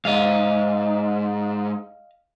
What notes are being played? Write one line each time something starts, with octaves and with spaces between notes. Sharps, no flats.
G#2 D#5 F5